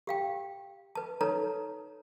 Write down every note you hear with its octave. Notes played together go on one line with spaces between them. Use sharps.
G4 F5 G5
B4 A5
D#4 A4 B4 C#5 A5 A#5